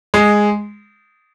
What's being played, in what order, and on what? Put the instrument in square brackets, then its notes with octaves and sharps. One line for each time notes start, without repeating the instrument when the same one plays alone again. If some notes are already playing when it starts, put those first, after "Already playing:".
[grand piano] G#3